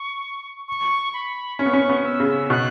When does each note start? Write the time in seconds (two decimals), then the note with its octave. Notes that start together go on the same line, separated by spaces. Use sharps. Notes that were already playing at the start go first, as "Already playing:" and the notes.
Already playing: C#6
0.68 C#6
1.14 B5
1.59 C#4 C#6
1.66 B3
1.73 C#4
1.89 B3
2.05 E6
2.20 C#3
2.50 B2 F#6